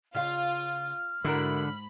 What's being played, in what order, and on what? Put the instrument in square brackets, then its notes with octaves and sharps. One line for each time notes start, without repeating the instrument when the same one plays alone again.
[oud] C#3 F5 [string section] F4 [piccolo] F6
[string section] G#2 B5 [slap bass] D3 [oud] E4 F#4 A#4